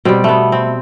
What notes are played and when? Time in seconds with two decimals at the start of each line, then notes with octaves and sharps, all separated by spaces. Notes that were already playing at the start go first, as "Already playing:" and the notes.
0.05 B2 G3 C4
0.24 A3 B3
0.52 C4